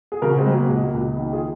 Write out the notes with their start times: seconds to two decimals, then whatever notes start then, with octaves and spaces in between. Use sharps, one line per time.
0.12 G#4
0.22 C#3 F#4 A#4
0.38 G#3 C4
0.46 F#3
0.54 A#3
0.69 C#2 G#3
0.85 A#3
0.94 C#2
1.01 G#3
1.17 D#3 A#3
1.32 F4 G#4